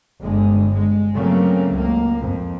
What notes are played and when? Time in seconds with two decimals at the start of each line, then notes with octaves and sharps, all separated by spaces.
0.21 G1 D3 G#3
0.72 G#3
1.14 C#3 F#3 A3 A#3 C4
1.75 C#2 A#3
2.21 F2